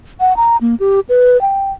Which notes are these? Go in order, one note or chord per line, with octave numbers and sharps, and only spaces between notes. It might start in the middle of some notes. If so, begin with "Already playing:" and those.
F#5
A#5
A#3
G4
B4
G5